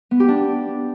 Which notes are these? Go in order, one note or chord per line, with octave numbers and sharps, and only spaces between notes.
B3
G4
D4